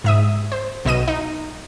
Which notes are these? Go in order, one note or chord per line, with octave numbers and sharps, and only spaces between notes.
G#2 E5 D#6
C5
B1 B2 D#5 D#7
D#4